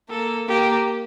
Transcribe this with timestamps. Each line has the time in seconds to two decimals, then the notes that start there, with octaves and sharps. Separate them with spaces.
0.10 A#3 A4
0.48 A#3 G4